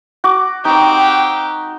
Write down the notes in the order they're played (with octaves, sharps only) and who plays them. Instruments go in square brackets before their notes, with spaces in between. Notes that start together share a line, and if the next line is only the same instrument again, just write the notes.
[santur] F#4 D6
[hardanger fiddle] C4 G4 [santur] D#4